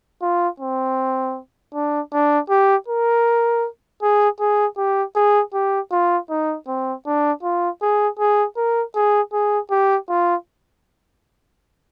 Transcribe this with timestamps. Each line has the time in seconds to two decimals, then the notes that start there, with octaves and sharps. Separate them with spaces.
0.22 F4
0.60 C4
1.74 D4
2.13 D4
2.49 G4
2.88 A#4
4.02 G#4
4.40 G#4
4.77 G4
5.15 G#4
5.53 G4
5.92 F4
6.30 D#4
6.67 C4
7.06 D4
7.43 F4
7.82 G#4
8.19 G#4
8.56 A#4
8.95 G#4
9.33 G#4
9.71 G4
10.09 F4